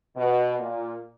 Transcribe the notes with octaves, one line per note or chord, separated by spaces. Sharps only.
B2
A#2